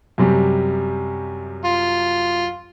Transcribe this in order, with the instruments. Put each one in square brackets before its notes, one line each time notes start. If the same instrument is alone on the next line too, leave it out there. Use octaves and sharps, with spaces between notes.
[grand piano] F#2 C3 G3
[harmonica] F4